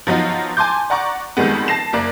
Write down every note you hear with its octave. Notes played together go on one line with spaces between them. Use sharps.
F3 F#3 B3 D#4 F4
G#5 A5 C6 D6 G6
D5 F#5 A#5 C#6 D6
F2 D#3 G3 G#3 B3
A5 A#6 C7 E7
F#1 A#3 D5